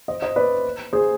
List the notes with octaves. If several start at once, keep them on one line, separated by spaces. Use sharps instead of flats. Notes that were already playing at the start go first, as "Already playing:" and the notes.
C5 D#5
C5 D#5
B4 D5
G#4 C5